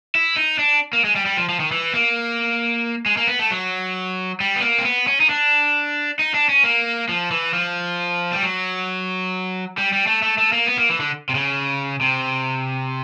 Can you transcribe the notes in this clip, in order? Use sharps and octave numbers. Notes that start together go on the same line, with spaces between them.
E4
D#4
D4
A#3
G#3
G3
G3
F3
F3
D#3
E3
A#3
G#3
A#3
B3
A3
F#3
G3
B3
A#3
C4
B3
C#4
D#4
D4
D#4
D4
C#4
A#3
F3
E3
F3
G3
F#3
G3
G3
A3
A3
A3
A#3
B3
A#3
E3
D3
C3
C#3
C3